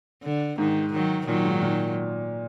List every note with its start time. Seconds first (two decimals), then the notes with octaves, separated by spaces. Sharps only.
0.24 D3
0.58 G#2 D#3
0.93 D#3 F#3
1.26 A#2 D#3 F#3
1.44 G#2
1.61 A#2